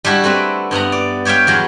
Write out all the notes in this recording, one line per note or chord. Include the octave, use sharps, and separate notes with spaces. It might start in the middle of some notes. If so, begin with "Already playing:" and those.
G3 D4 E4 F#4
A3 C4 F#4 B4
G2 B3 F#5 A#5
D5
G4 C#5 E5 F5 G5
E2 F#3 C#5